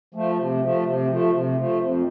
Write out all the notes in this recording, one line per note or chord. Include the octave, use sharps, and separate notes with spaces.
F3 A3
C3
F3 A3
C3
F3 A3
C3
F3 A3
F2